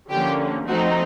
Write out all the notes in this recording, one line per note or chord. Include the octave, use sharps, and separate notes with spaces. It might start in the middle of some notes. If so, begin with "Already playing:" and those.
D3 F3 A#3 C#4 G4
F3 A3 C4 D#4 F#4